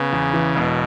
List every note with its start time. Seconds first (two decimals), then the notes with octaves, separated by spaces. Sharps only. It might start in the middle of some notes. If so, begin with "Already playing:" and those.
Already playing: C#3 B3
0.13 E2
0.34 E3
0.55 E1 B2